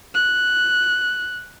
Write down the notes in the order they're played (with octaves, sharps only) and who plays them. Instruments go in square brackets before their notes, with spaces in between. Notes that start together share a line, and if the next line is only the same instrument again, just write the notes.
[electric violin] F#6